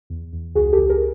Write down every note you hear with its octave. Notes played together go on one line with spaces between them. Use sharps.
E2
E2
C#2 F#4 G#4
G4 A4
C#2
G#4 A#4